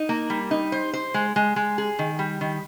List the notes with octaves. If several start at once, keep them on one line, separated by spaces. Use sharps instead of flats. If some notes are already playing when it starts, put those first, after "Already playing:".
Already playing: D#4
A#3
G3
D#4
C5
C5
G#3
G#3
G#3
G#4
D#3
G3
D#3